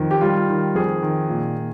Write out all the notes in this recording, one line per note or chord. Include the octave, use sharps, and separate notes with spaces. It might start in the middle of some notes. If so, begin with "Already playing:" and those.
Already playing: F2 D#3
G4
G3 F4
D#3
F2 G#4
D#3
A#2
A#2